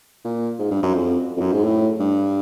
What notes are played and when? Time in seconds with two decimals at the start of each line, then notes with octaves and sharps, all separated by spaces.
0.25 A#2
0.59 G#2
0.71 G2
0.83 F#2
0.94 F2
1.37 F2
1.41 F#2
1.53 G#2
1.64 A2
2.00 G2